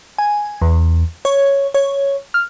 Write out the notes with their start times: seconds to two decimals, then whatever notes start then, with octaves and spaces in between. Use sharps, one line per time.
0.18 G#5
0.62 E2
1.25 C#5
1.74 C#5
2.34 F6